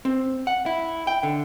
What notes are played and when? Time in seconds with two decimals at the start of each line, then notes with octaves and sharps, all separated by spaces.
0.05 C4
0.47 F#5
0.66 E4
1.07 G5
1.23 D3